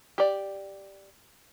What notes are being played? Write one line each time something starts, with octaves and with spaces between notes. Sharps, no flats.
G4 D5